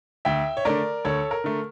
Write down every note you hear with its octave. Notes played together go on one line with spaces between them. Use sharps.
D2 E5 G5
C#5
D3 A3 A#4 D5
D2 A4 C#5
A#4
D3 A3